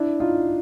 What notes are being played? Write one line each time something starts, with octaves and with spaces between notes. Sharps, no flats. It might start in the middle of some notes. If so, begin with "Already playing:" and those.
Already playing: D4 E4
D#4 F4